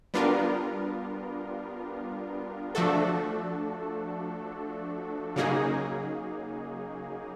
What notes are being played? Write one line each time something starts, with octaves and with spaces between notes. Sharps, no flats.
G3 B3 D4 F4 A#4
F3 A3 D4 F#4 A4
C#3 F#3 A#3 D#4 G#4